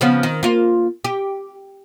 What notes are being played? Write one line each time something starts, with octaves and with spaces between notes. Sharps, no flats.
C#3 F3 B3
D#3
A#3 F4
G4